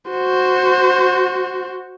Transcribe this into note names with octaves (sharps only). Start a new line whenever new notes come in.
F#4 C5